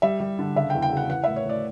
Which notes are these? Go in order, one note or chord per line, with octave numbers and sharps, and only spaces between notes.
G3 E5
G3
D3
C#3 E5
G5
E2
G5
C#3 F#5
E3 F#5
A2 E5
C#5
A2 D5